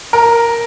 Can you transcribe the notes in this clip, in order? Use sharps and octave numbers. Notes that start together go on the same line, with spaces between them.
A#4